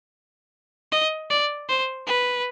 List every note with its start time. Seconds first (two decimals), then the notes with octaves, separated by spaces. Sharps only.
0.92 D#5
1.30 D5
1.69 C5
2.07 B4